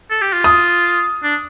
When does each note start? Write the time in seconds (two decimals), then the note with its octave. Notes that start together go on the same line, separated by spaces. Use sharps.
0.11 A4
0.22 G4
0.33 F4
0.44 D#6
1.23 D4